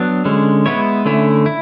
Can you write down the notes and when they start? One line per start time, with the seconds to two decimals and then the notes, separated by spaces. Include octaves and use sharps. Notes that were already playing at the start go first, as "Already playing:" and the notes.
Already playing: F#3 B3 D4
0.25 D3 G#3 C#4
0.66 G#3 B3 E4 C#5
1.06 D3 A3 C#4 E4
1.46 E4